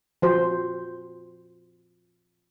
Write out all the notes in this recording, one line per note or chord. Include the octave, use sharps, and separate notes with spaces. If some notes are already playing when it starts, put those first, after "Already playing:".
F3 F#4 C5